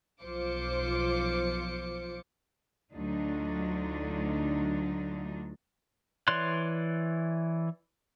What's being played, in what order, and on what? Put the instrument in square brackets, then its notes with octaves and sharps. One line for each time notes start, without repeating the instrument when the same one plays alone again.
[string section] B1 F3 F4 C5 D6 C#7
[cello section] D2 D3 F#3 D4 D#4 F4
[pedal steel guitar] E3 C#5 D5 C6 F#6